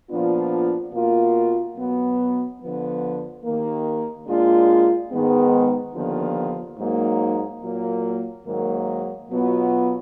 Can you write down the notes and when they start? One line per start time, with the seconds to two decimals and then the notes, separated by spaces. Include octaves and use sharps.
0.10 A#2 F3 B3 D4 F4
0.93 B2 A#3 F4
1.77 B2 F#3 B3
2.61 D3 F3 B3
3.44 D#2 D#3 A#3
4.28 A#2 G#3 D4 F4
5.11 G#2 D#3 G#3 B3
5.95 D#2 D3 F3 B3 F4
6.78 G#2 F#3 A#3 D#4
7.62 A#2 F#3 A#3
8.46 G#2 D#3 F#3 A#3
9.29 B2 F#3 B3 F4